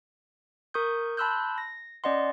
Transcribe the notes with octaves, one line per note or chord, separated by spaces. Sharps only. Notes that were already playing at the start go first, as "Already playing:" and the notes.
A#4 C#6 D#6 G6
A5 B5 C6 E6 F#6 G6
A#6
C#4 D5 D#5 F#5 C6